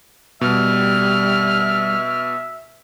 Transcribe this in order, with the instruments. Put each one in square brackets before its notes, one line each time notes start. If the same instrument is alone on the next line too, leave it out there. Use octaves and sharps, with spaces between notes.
[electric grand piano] B2 [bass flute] G3 [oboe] E5 [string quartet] F6